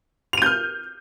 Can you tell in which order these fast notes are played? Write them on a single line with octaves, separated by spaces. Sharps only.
F7 D#7 G6 F6